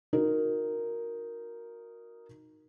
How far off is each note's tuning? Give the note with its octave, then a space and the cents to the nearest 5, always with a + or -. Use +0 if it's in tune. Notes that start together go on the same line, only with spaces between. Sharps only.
D#4 +0 F#4 -25 A#4 +0